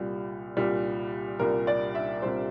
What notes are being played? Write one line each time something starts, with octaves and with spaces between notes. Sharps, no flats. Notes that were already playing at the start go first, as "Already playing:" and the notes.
Already playing: C2 A#2 G3
C2 A#2 G3
C2 A#2 G3 A#4
D5
E5
C2 A#2 G3 C5